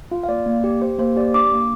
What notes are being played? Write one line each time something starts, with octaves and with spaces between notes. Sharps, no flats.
F4 F5
F5
A#3 D5
A#3
G4
G4 C5
A#3 C5
G4 D5
D4 D6
A#3